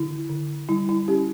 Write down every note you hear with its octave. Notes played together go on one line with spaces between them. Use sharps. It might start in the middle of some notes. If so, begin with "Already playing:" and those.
Already playing: D3 E4
D3
G3 E4
E4
C#4 G4